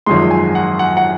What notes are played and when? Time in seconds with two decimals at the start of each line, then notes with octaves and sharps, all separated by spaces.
0.06 G#1 F#2 F3 G#3 C6
0.31 G#5
0.55 F#5
0.79 F#5
0.97 F#5